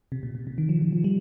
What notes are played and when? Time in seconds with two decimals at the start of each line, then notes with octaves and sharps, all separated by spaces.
0.12 C3
0.23 A#2
0.35 A#2
0.47 C3
0.58 D#3
0.69 F3
0.81 F3
0.92 F3
1.04 G3